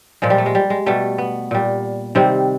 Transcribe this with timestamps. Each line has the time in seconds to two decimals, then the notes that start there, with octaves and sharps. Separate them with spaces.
0.22 A#2 F3 G#3
0.30 G3
0.38 A3
0.46 G#3
0.55 G3
0.70 G#3
0.86 B2 G3 A3
1.18 B3
1.51 A#2 G3
2.15 C3 D#3 G3 C4